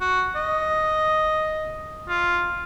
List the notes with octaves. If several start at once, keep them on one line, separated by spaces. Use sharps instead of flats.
F#4
D#5
F4